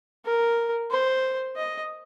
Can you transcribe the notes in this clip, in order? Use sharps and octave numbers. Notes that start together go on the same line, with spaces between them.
A#4
C5
D#5